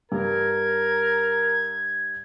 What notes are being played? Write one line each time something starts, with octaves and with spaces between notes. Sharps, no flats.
G2 A#4 G#6